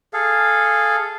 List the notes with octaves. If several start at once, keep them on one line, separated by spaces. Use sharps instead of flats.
G#4 A4 F5